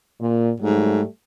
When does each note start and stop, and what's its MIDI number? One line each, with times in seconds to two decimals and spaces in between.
0.20 0.51 46
0.60 1.02 44
0.60 1.06 54
0.60 1.06 55
0.60 1.06 57